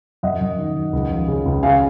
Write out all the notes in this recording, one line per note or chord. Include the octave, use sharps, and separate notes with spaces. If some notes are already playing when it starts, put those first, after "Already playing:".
F#2 D#5 F#5
F#2
D#3
D#3
C#2
F3
C#3
C#2
C#3 F5 G#5